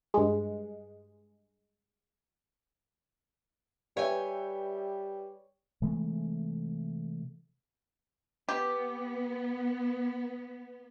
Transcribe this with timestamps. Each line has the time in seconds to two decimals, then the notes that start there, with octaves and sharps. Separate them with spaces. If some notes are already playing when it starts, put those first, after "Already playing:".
0.14 G2 G#3
3.97 G3 B4 C#5 E5 G5 G#5
5.82 C3 E3 G#3 A3
8.49 B3 G4